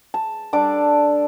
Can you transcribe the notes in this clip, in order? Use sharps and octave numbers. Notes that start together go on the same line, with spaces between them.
A5
G3 D4 A4 D6